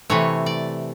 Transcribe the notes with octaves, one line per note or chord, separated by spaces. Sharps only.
C3 E3 A3 C#5
D5